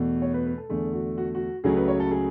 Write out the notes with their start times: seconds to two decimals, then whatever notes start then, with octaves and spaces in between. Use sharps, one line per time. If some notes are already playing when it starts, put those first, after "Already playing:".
Already playing: E2 B2 A3
0.22 C#5
0.34 B4
0.47 B4
0.58 A4
0.69 E2 D3 A3 G#4
0.93 F#4
1.18 F#4
1.35 F#4
1.64 C#2 C#3 F#3 A3 G#4
1.77 B4
1.88 C#5
2.00 A4
2.11 G#4